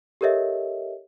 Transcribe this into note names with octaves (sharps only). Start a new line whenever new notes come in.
G4 A4 A#4 C#5 D#5 E5